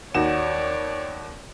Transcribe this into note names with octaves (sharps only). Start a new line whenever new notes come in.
D#2 F#4 C#5 D5 E7